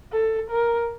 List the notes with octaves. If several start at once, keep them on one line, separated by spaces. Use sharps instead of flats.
A4
A#4